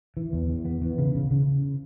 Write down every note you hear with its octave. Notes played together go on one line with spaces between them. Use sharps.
E3
E2
E3
B3
E3
C#3
C#3
C#3